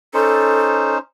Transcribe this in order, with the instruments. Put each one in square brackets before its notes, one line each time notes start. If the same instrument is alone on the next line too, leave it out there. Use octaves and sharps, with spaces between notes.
[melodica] C#4 D#4 C5 [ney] A4